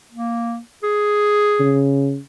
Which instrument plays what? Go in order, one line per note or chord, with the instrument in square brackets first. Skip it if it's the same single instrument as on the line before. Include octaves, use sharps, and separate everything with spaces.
[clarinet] A#3
G#4
[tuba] C#3